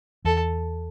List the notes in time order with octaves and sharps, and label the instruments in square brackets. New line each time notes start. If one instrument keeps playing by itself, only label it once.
[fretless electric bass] E2 [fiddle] A4